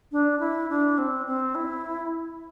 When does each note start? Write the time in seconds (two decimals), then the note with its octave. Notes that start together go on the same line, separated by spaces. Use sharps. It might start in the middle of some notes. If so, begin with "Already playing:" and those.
0.12 D4
0.40 E4
0.70 D4
0.98 C4
1.27 C4
1.55 E4